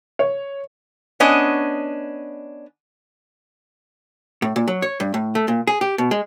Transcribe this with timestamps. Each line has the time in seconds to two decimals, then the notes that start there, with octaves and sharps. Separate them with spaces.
0.19 C#5
1.20 B3 C#4 D4 D#5
4.42 A2
4.56 A#2
4.68 F#3
4.82 C#5
5.00 G2
5.14 A2
5.35 A3
5.48 A#2
5.67 G#4
5.81 G4
5.98 B2
6.11 G#3